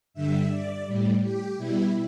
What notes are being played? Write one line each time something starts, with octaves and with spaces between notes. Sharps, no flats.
G2 D3 G3 E5
D5
A2 G3
G4
B2 G3 E4